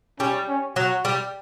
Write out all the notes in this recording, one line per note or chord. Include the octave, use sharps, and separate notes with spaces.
G3 C#4
C#4
F#3 F#4
G3